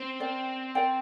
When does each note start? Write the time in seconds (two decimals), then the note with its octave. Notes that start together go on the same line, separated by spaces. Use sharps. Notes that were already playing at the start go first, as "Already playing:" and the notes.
Already playing: C4
0.20 A#4 D5 G5
0.75 A#4 D5 G5